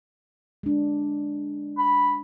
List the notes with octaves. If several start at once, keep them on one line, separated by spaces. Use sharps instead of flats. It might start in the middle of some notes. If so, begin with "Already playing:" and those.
G#3 D4
B5